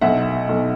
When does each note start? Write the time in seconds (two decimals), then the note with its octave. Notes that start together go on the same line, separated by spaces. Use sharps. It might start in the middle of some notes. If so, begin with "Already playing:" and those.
0.01 B1 E5 F#5
0.49 B1